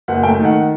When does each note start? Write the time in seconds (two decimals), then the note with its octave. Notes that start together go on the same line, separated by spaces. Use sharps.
0.08 F#1 F#5
0.24 A3 G5
0.40 D#3
0.45 F#5